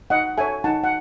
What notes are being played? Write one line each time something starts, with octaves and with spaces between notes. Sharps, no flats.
D#4 D#5 F#5
A4 C#5 E5 G#5
D#4 F#5 A5
F#5